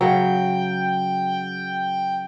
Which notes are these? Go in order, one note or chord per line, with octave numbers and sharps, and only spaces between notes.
C#3 F#3 G5